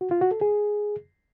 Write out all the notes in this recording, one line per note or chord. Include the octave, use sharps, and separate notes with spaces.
F#4
F4
F#4
A4
G#4